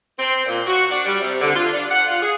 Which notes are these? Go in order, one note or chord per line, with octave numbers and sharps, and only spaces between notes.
C4
A#2
F#4
D4
G3
C3
D3
F4
D4
F#5
F4
G#4